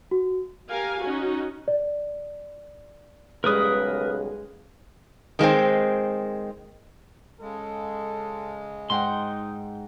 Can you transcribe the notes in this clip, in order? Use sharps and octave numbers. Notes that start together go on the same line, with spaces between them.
F#4
G4 A#4 F5 G#5
C#4 D#4 F#4
D5
B1 C#3 G3 G#3 A#4 B4 C#5 D#6
D#3 G#3 A#3 C4
C#3 G#3 A4
G#2 D#4 F#5 G5 C6